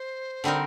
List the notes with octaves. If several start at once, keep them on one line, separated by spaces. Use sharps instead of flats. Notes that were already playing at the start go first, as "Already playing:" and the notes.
Already playing: C5
D3 G3 C4 D#4 A#4